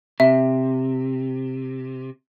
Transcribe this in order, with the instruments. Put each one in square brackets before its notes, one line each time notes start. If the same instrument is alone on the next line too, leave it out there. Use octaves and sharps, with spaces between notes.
[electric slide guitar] C3 [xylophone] E5